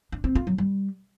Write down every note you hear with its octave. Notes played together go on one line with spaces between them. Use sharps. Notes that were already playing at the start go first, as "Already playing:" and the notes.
D4
C4
F4
F#3
G3